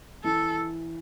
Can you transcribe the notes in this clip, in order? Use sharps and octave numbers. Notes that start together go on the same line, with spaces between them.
E3 A4